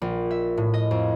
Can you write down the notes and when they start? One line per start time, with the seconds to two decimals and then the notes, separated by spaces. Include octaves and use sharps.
0.02 A#1
0.31 E5
0.58 A2
0.74 D#5
0.91 F2